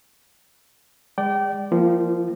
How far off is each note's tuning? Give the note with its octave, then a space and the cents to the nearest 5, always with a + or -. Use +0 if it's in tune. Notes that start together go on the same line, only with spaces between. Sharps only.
G#3 -35 D5 +0 G5 -30
F3 -15 A#3 +0 E4 +25